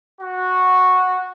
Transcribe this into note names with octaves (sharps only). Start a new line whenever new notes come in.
F#4